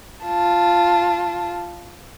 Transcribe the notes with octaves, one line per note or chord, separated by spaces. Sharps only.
F4 A5